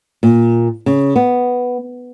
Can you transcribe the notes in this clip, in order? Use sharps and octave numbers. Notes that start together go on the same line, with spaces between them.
A#2
C#3
B3